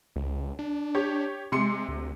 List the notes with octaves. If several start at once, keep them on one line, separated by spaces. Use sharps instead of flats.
C#2
D4
G4 C#5
C3 G#3 C6 C#7
D2